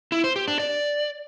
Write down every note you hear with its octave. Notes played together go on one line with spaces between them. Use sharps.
E4
C5
G4
D4
D5